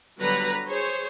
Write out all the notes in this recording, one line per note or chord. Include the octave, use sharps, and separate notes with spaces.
D3 F#3 G3 B3 B4 A#5
G#4 C5 C#5